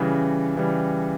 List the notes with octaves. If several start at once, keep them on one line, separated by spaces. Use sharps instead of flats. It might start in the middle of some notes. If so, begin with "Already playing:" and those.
Already playing: C#3 E3 G3
C#3 E3 G3